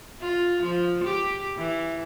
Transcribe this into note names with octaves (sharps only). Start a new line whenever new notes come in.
F4
F3
G4
E3